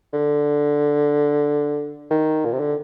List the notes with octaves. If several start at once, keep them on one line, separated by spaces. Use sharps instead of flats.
D3
D#3
A#2
C3
D3